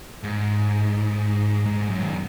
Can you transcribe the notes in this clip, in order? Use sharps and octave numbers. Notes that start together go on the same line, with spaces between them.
G#2
G#2
F#2
D#3